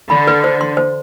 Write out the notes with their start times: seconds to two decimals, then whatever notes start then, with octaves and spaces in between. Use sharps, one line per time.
0.10 D3 B5
0.27 B4
0.44 C5
0.61 C6
0.77 C5